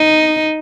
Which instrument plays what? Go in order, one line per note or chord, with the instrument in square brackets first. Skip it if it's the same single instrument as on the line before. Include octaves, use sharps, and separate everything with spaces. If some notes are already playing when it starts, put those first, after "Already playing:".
Already playing: [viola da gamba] D#4